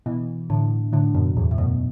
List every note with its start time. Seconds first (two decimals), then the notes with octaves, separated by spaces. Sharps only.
0.06 B2 E3
0.50 A2 D3
0.93 A2 D3
1.15 F#2 B2
1.37 E2 A2
1.51 A2
1.58 F#2 B2